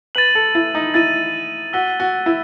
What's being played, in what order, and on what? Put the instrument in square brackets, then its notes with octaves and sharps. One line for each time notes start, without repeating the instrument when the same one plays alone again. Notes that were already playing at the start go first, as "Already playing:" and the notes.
[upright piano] B4 [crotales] A6 D#7 F#7
[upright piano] A4
E4
D#4
[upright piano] E4 [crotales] A6 D#7 F#7
[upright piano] F#4 [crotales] E6 B6 D#7 G7
[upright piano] F#4
E4